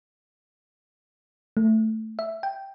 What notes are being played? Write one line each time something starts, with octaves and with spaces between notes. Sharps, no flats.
A3
E5
G5